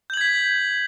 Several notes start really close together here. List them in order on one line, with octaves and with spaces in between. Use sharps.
G6 F#7 G#6 B6